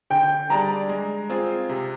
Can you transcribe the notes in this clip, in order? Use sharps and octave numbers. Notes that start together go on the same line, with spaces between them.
D3 G5
G3 D4 G#4 D5 A#5
G#3
C4 F4 G#4
C3